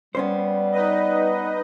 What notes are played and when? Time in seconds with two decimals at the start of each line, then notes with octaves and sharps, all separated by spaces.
0.15 G3 B3 C#4 C5
0.72 D#4 B4 D#5